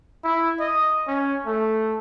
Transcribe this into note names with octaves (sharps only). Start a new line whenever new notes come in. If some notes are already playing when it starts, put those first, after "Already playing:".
E4
D#5
C#4
A3